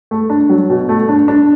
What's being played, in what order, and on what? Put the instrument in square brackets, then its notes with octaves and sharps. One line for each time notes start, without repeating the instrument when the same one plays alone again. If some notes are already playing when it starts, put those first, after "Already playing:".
[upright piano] A3
D4
F#3
B2
A3
D4
D4